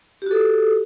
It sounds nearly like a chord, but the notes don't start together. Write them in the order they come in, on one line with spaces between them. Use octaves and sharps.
G4 F#4 A4